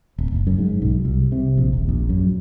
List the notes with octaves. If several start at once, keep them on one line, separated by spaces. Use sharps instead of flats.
D1
F#1
F#2
G#2
B1
C2
C3
A#1
D#1
A#1
F#2